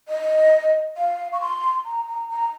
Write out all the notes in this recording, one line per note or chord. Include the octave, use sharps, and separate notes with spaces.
D#5
F5
C#6
C6
A#5
A#5
A#5